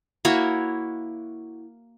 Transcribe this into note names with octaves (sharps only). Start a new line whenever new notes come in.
A#3 E4 F#4 C#5